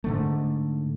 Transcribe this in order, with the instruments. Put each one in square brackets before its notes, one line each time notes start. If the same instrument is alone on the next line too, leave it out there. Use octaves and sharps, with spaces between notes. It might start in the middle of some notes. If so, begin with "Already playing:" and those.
[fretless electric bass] G#2 D3 A3